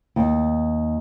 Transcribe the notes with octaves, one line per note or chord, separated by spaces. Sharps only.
D#2